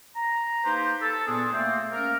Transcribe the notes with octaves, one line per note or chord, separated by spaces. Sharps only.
A#5
A#3 D#4 G4 B4 C5
A4
A#2 B3 D4 G#4
A3 A#3 C4
A#3 C#4 A#4